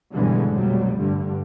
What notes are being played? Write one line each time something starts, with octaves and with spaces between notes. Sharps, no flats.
B1 G2 D3 E3 G3 G#3
F1 B1 F#3 G3
G2 D3